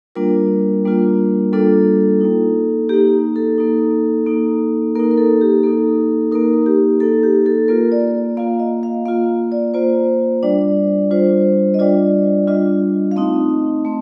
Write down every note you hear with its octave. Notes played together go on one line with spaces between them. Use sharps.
G3 A#3 D4 F4 A#4
G3 A#3 D4 F4
G3 A#3 D4 F4 A4
A#3 D#4
A#3 D#4 G4
A4
A#3 D#4
A#3 D#4
A#3 D#4 A#4
A#4
A4
G4
A#3 D#4 A4
A#3 D#4 A#4
G4
A#3 D#4 A4
G4
A4
A#3 F4 A#4
D5
A#3 F4 F5
D#5
F5
A#3 F4 F5
D5
A#3 F4 C5
G3 D4 F4 D5
G3 D4 F4 C5
D#5
G3 D4 F4 D5
G3 D4 F4 D#5
F5
A3 C4 D#4 D#5
A3 C4